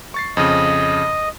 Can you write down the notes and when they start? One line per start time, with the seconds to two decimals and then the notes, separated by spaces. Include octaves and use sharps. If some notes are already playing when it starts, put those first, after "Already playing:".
0.14 C#6 A6 C7
0.37 F2 C#3 D#5